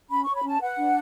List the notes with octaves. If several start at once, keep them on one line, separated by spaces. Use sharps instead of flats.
C#4 B5
C#5 C#6
B5
C#4 A5
B4 F#5
D4